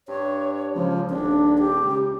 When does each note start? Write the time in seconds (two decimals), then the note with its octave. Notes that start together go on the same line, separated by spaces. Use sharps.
0.08 G2 C#5
0.75 C#2 F3
1.10 D#1 D4
1.58 G4
1.82 C#2